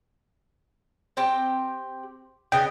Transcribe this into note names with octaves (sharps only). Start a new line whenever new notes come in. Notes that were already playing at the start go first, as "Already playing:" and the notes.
C4 G4 G5
C#3 B3 D#5 G5